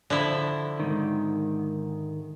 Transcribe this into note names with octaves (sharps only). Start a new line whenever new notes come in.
D3 F3 E4
G#2 D#3